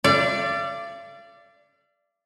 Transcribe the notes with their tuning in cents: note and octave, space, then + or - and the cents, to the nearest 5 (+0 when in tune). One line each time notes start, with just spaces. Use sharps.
D5 +0 F5 -45